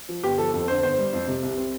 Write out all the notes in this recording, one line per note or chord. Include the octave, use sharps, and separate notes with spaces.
F3
G1 G4
F3 A4
F2 A4
D3 C5
G1 C5
G3
F2
C3
C2
C4